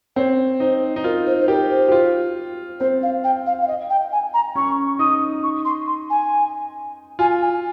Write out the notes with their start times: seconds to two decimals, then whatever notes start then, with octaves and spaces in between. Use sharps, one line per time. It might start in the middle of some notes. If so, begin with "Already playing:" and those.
0.16 C4 C#5
0.60 D#4 C5
0.96 D#4
1.04 F4 A#4
1.26 C5
1.41 C5
1.48 G4 A#4
1.70 C5
1.88 G4
1.92 F4
2.80 C4 C5
3.03 F5
3.24 G5
3.46 F5
3.62 F5
3.68 D#5
3.90 G5
4.12 G#5
4.34 A#5
4.55 C#4 C#6
4.99 D#4 D#6
5.43 C#6
5.65 C6
5.87 C6
6.10 G#5
7.19 F4 G#5
7.42 G#5